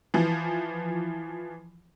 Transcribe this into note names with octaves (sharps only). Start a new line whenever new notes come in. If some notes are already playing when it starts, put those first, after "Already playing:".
E3 F3